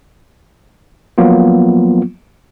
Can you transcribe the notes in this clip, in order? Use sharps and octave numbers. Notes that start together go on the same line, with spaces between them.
F3 F#3 A#3 B3 F4